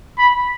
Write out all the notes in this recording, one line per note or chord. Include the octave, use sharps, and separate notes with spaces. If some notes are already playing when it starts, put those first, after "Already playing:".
B5